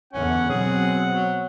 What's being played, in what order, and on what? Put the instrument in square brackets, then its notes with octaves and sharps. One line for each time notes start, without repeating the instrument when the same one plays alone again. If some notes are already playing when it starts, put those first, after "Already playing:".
[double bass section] E2 D3 E3 [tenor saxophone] C#4 [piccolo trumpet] F#5
[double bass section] B2 F#3 C4 [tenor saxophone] G#4
[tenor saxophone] F#3